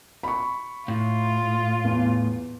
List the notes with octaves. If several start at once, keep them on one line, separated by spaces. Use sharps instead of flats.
B5 C#6
A2 F4
E2